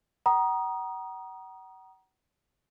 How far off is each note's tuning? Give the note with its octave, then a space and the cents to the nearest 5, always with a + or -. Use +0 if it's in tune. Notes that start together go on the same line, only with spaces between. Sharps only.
F#5 +40 A#5 +25 D#6 -10